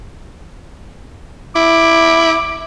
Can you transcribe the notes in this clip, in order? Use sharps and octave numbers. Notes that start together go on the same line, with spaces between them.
E4 D6